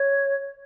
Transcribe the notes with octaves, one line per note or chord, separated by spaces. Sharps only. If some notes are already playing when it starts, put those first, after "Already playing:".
Already playing: C#5